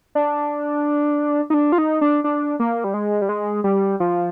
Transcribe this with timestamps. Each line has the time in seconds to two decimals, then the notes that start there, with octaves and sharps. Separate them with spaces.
0.15 D4
1.50 D#4
1.54 D4
1.72 F4
1.78 D#4
2.01 D4
2.24 D4
2.60 A#3
2.84 G3
2.94 G#3
3.22 G3
3.29 G#3
3.64 G3
4.00 F3